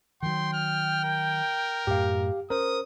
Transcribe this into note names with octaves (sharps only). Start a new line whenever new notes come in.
D#3 F#3 G5 C6
F6
A#4
F#2 A2 G4 F5
C#4 A#4 C5 D#6